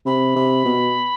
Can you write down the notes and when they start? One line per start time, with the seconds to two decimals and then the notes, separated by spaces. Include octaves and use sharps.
0.06 C3 B5
0.36 C3
0.65 B2